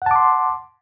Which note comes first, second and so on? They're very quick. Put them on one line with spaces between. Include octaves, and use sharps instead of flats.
F#5 A5 D6 C6